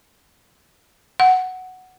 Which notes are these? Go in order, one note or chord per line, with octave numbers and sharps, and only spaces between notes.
F#5